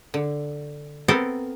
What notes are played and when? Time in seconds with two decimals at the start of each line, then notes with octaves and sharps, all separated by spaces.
0.14 D3
1.08 B3 C4 A4 A#4